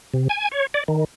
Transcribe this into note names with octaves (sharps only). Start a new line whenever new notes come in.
C3
G#5
C#5
D5
D#3